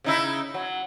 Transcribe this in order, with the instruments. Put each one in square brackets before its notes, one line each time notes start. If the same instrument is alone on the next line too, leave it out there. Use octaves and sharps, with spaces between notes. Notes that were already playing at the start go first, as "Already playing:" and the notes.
[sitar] C#3 D#4 E4
F#3